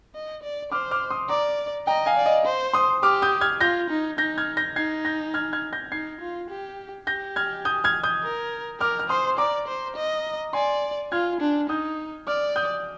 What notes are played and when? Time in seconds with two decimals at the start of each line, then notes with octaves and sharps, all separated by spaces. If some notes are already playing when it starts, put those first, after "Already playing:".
0.15 D#5
0.43 D5
0.72 C5 D6 F6
0.91 D6 F6
1.10 C6 D#6
1.29 D5 A#5 D6
1.87 D#5 G5 A#5
2.06 F5 G#5
2.16 D5
2.26 D#5
2.45 C5
2.73 C6 D#6
3.03 G4 D6 F6
3.22 D#6 G6
3.41 F6 G#6
3.61 F4 G6 A#6
3.90 D#4
4.18 D#4 G6 A#6
4.38 F6 G#6
4.57 G6 A#6
4.76 D#4 G#6 C7
5.05 G6 A#6
5.34 F6 G#6
5.53 F6 G#6
5.73 G6 A#6
5.92 D#4 G#6 C7
6.21 F4
6.50 G4
7.07 G4 G6 A#6
7.36 F6 G#6
7.65 D#6 G6
7.84 F6 G#6
8.03 D#6 G6
8.23 A#4
8.80 A#4 D6 F6
8.99 F6
9.09 C5 C6 D#6
9.38 D5 A#5 D6
9.67 C5
9.96 D#5
10.53 D5 G#5 C6
11.12 F4 F6 G#6
11.41 D4
11.69 D#4 D#6 G6
12.27 D5 D6 F6
12.56 D#6 G6